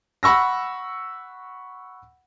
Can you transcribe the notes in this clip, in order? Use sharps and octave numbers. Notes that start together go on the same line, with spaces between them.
F#5 B5 C#6 E6 A#6